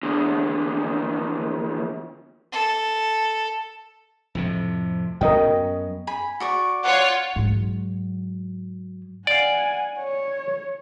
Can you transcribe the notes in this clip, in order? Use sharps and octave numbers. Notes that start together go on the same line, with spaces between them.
E2 D3
A4
F2 A2 C3
F#2 B3 C#4 A#4 D#5 G5
G#5 B5
F#4 D5 C#6
F4 C#5 F#5
G#2 F#3
D5 F5 F#5 G#5
C#5